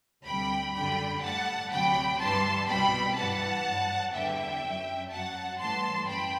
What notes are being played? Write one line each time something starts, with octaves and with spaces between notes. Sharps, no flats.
D2 C3 G3 G5 B5
F#2 D3 G3 G5 B5
A2 G3 F#5 A5
D2 C3 F#3 G5 B5
G2 E3 G3 A5 C6
C2 B2 G3 G5 B5
G2 E3 G3 F#5 A5
G2 F#3
E2 D3 G3 E5 G5
F#2 F#3
F#2 F#3 F#5 A5
A2 E3 G3 A5 C6
F#2 G5 B5